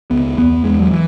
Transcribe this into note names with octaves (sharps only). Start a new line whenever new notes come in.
C#2 B3
E2 B3
E2 G#3
F#3
E3